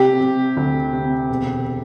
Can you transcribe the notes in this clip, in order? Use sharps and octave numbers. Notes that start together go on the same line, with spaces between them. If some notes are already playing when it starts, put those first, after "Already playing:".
Already playing: C3 G4
C3
D2
C3
E1